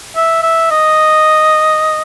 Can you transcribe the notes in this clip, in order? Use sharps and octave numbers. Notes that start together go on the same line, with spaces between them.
E5
E5
D#5